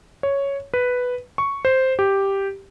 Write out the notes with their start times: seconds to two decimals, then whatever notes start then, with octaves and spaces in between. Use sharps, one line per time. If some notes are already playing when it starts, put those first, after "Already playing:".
0.23 C#5
0.74 B4
1.38 C#6
1.65 C5
1.99 G4